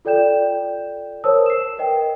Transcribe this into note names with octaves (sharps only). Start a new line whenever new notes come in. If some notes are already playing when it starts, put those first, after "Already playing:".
F4 A4 D5 G5 G6 E7
A#4 C5 C#5 A5 D#6 E6
C7 E7
A#4 B4 D#5 G5